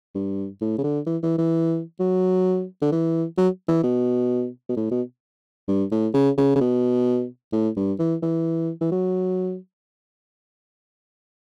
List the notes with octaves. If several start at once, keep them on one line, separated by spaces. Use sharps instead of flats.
G2
A2
C#3
D3
E3
E3
E3
F#3
D3
E3
F#3
E3
B2
B2
A2
B2
G2
A2
C#3
C#3
C#3
B2
A2
G2
E3
E3
E3
F#3